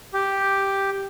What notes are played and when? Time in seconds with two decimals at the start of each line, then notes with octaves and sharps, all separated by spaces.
0.14 G4